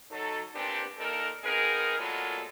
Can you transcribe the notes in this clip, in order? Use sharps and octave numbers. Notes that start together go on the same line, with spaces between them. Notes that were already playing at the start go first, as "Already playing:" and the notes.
F#3 D#4 A4
A#2 B3 C4 D4 G4
A#2 A#3 D#4 A4 A#4
B3 C4 D#4 G#4 A#4
A#2 F#3 G#3 B3 F4 A4